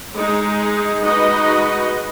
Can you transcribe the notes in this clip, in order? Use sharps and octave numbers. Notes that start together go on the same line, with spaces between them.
G#3 D#4 G#4
G#3 D#4 F#4 B4 D#5